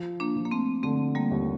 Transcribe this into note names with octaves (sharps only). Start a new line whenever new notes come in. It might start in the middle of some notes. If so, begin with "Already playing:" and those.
Already playing: F3
A#3 D4
F3
A#3
A3 C4
D3 A3 C4
G3 A#3
D#2